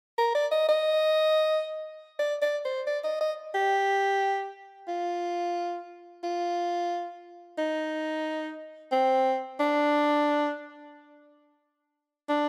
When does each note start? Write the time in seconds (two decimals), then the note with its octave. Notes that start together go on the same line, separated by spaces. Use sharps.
0.18 A#4
0.35 D5
0.52 D#5
0.69 D#5
2.19 D5
2.42 D5
2.65 C5
2.87 D5
3.04 D#5
3.21 D#5
3.54 G4
4.88 F4
6.23 F4
7.58 D#4
8.92 C4
9.60 D4
12.29 D4